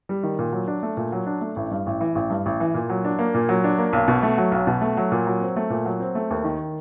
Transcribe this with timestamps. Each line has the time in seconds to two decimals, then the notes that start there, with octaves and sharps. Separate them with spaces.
0.09 G3
0.23 D#3
0.39 A#2
0.53 F#3
0.68 D4
0.83 A3
0.97 A#2
1.12 F#3
1.27 D4
1.41 A3
1.56 A1
1.71 G2
1.87 A1
2.01 E3
2.15 A1
2.30 G2
2.46 A1
2.60 E3
2.74 A#2
2.89 F#3
3.05 D4
3.19 A#3
3.34 A#2
3.49 F#3
3.64 D4
3.78 A#3
3.93 B1
4.08 B2
4.23 A3
4.38 F#3
4.52 B1
4.67 B2
4.81 A3
4.97 F#3
5.12 A#2
5.27 F#3
5.41 C4
5.56 A3
5.70 A#2
5.86 F#3
6.00 C4
6.15 A3
6.30 D#2
6.44 D#3